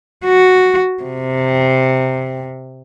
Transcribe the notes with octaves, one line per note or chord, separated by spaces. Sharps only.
F#4
C3